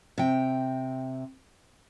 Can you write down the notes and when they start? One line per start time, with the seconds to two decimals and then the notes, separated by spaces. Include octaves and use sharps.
0.18 C3 G5